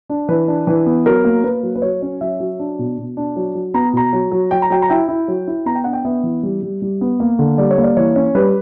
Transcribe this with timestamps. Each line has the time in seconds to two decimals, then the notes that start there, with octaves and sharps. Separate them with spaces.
0.09 D4
0.28 E3 B4
0.48 D4
0.67 E3 B4
0.86 B3
1.06 F#3 A#4
1.25 A#3
1.44 A#3 B4
1.63 F#3
1.75 B4
1.82 F#3 C#5
2.02 C#4
2.21 F#3 E5
2.40 F#3
2.59 D4
2.79 B2
2.98 B2
3.17 D4
3.36 F#3
3.55 F#3
3.74 B3 A#5
3.93 B2 A#5
4.13 F#3
4.32 F#3
4.51 F#3 G5
4.62 A#5
4.70 F#3 G5
4.82 A#5
4.89 E4 G5
5.08 E4
5.28 F#3
5.47 E4
5.66 B3 A#5
5.75 G5
5.84 D4 F#5
5.93 G5
6.05 B3 E5
6.23 E3
6.43 G3
6.62 G3
6.82 G3
7.01 B3
7.20 A#3
7.39 D3
7.58 G3 D5
7.71 C#5
7.78 A#3
7.83 D5
7.97 E3 C#5
8.16 C#4
8.35 G3 B4